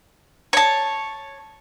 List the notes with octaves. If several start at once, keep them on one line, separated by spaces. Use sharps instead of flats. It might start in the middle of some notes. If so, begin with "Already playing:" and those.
C#5 A5